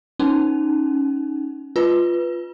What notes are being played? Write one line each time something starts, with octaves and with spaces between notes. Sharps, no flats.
C#4 D#4
F4 B4